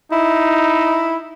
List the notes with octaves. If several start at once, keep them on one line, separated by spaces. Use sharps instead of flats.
D#4 E4